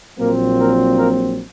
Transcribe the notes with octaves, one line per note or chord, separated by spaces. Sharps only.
A#1 A#2 F#3 A#3 C4 A#4
A#3 A#4
A#3 A#4